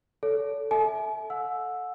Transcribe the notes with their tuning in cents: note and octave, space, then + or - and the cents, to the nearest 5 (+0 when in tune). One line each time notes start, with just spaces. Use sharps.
A4 +0 C#5 +40
A4 +0 E5 -15 G#5 +45
F#5 -30 E6 +0